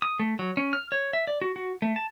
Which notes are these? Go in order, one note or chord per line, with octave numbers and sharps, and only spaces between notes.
D#6
A3
F#3
C#4
F6
C#5
E5
D5
F#4
F#4
A3
A5